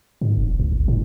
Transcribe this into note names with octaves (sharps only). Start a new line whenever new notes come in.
G#2
F1
C#2
G1
A2